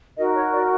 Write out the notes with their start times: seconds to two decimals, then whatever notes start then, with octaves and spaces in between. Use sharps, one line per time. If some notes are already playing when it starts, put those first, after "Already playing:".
0.17 D#4 F#4 A#4 D#5
0.34 C#5
0.52 D5